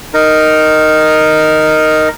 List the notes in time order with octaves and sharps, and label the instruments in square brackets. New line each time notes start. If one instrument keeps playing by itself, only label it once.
[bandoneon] D#4 A#4